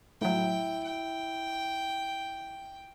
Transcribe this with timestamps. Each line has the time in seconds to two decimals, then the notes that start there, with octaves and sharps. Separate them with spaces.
0.21 A2 F#3 E4 G5
0.85 G5